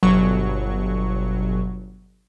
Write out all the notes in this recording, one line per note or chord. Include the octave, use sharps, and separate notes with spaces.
G1 B2 F#3 C#6